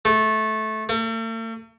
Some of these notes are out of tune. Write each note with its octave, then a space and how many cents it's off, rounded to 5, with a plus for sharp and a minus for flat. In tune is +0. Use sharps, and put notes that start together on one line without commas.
A3 -15
A3 +45